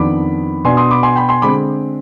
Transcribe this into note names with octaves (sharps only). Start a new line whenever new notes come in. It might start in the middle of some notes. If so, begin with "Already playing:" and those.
Already playing: F2 D#3 B3 D4 B5 D6
B2 B3 D4 G#5 C6
C6 D#6
B5 D6
G#5 C6
G5 B5
G#5 C6
D3 G#3 C4 B5 D6